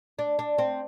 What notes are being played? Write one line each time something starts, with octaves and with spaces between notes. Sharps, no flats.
D4
D4
C4